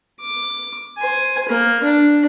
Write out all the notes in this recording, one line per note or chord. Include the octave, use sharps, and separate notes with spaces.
D6
C5 G#5
A#3
D4